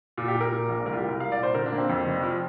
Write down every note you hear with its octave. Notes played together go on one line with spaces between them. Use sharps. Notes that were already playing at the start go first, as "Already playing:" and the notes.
A#2 F4
G4
A#2
A#4
A#2
A#1
C2 A#4
F4
G4
C2
A#4
C2 F5
D5
A#2
C5
D3 A#4
D4
A#3
C4
F2
F1
F3